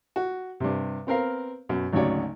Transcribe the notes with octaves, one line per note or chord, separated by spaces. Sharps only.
F#4
G2 C3
B3 C4 A#4 F5
F#2 B2
G#1 D2 C#3 F#3 C#5 D5